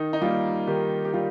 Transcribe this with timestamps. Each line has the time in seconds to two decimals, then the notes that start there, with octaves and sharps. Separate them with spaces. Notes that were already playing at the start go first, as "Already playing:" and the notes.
Already playing: D#3 D#4
0.13 D#4
0.22 G3 A#3 F4
0.67 D#3 G4
1.05 G4
1.14 G3 F4